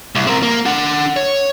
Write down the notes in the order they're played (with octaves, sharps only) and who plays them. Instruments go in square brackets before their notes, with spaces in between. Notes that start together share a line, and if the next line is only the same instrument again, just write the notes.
[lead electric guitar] C2
C4 A#4
A#3
D4 F#5
C#5